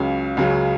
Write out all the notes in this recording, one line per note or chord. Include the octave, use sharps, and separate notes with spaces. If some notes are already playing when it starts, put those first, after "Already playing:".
Already playing: C#2 C#3 F#3
C#2 C#3 F#3